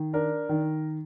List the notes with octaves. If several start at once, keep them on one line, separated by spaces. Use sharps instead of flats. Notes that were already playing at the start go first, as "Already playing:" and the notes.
Already playing: D#3
D4 A#4
D#3